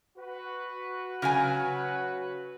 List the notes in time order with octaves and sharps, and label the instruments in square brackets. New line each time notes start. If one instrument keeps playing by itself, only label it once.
[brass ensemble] F#4 B4
[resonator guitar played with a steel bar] C#3 F#3 G#5